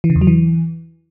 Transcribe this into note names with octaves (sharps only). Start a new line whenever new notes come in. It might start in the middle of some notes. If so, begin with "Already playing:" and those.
E3
C#3
E2
F#3
E3